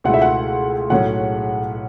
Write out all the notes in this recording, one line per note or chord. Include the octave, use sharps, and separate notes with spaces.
C#2 B2 A3 E4 F#5
E5
F#5
B1 A2 F#3 A3 C#4 F#5